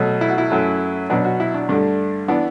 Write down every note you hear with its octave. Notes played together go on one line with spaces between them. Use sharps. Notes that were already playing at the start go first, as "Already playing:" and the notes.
Already playing: B2 F#3 A3
E4
F#4
E4
F#2 F#3 A3
B2 F#3 B3 D4
F#4
E4
D4
G2 D3 A3 D4
E3 B3 D4